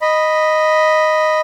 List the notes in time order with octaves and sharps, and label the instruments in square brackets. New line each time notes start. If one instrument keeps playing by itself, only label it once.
[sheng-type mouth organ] D#5 B5